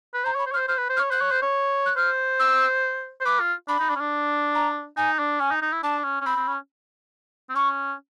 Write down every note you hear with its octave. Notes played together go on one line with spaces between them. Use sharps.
B4
C5 A#5
C#5 B5
C5
C#5 F6
C5
C5 F6
B4
C5
F6
C#5
C5 F#6
C#5
C5
C#5
F#6
C5 F6
E6
C5
B4 D6
F4
D4 B5
D#4
D4
C#4
D4
A#5
D#4 G#5
D4
C#4 G#5
D#4
D#4
E4
D4 A5
C#4
C#4
C4 B5
C4
C#4
C4
C#4 C#6